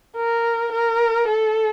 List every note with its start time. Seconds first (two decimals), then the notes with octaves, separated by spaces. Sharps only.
0.16 A#4
0.72 A#4
1.28 A4